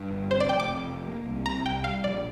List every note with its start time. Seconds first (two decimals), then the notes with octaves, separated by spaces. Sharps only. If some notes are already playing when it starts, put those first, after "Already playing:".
Already playing: G2
0.11 G1
0.30 C3 C5
0.40 D5
0.49 F1 G5
0.60 D6
0.69 F2
0.88 F1
1.08 A#3
1.27 C2
1.46 C3 A#5
1.65 C2 G5
1.84 G3 F5
2.03 A#1 D5